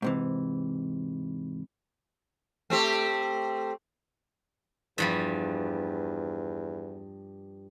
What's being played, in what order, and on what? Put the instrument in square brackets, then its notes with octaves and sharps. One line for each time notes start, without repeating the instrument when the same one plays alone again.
[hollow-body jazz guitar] G#2 C3 E3
[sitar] A3 C4 G4
[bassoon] E2 [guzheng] G2 F3 G3